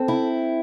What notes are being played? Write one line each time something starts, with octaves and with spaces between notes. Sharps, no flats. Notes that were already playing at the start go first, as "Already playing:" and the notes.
Already playing: C4 A4
E4